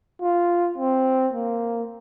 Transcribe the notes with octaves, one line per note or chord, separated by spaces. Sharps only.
F4
C4
A#3